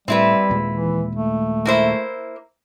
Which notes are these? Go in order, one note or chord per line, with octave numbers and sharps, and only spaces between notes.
A2 G3 C4 E4 B4
D#2 A#2 G#3
E3
A3
A#3 E4 C5